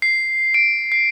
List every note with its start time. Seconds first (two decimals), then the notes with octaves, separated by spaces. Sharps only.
0.02 C7
0.54 D7
0.92 C7